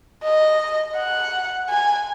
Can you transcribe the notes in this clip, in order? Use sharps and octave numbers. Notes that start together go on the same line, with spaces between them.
D#5
F#5
G#5